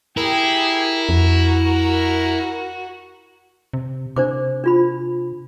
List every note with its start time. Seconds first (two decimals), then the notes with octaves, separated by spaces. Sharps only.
0.17 E4 G4 G#4 A#4
1.09 F2 F#4
3.73 C3
4.16 C3 D4 C5 D6
4.64 D4 F4 B5